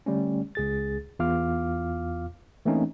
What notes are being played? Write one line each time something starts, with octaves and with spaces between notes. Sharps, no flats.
D3 G3 A3 C#4
C#2 G#4 A6
E2 F4 F5 D6 F6
E3 A3 A#3 C4 C#4 D#4